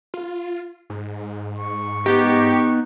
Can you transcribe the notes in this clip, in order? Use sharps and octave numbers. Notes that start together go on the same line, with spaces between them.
F4
G#2
C#6
B3 D#4 G4